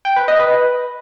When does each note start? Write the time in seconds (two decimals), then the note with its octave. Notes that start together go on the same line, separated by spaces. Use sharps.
0.05 G5
0.16 B4
0.28 D#5
0.39 B4